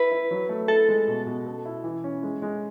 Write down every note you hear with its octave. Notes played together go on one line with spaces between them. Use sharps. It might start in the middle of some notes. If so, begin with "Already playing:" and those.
Already playing: E4 B4
E4
F#3
A3
E4 A4
G#3
B2
B2
A4
E4
E3
C#4
G#3
G#3